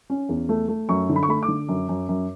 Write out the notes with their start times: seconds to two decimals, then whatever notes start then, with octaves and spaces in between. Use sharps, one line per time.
0.10 C#4
0.29 E2
0.49 A3
0.68 A3
0.89 F#2 C#6
1.09 D3
1.16 B5
1.23 C#6
1.28 A3 B5
1.43 D6
1.48 D3
1.68 F#2
1.89 F#2
2.09 F#2